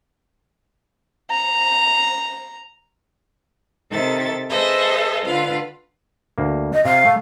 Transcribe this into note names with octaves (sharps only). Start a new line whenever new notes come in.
A#5
C3 D#3 A4 E5 A6
G#4 A4 B4 C5 D#5 E5
D3 F4 B4 F5
D2 A#3
D#5
C3 F5
A3